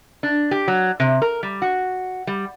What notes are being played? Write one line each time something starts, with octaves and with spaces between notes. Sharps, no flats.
D4
G4
F#3
C3
A#4
G3
F#4
G3